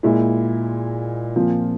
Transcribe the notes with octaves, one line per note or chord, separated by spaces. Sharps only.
A#2 G#3 E4
A#2 F3 C4 F4